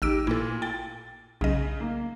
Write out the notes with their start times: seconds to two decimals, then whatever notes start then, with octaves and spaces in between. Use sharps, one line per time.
0.02 A1 D#4 G4 E6 D7
0.27 A#2 E4 A4
0.62 G5 A6
1.41 B1 C#3 D#5
1.80 A#3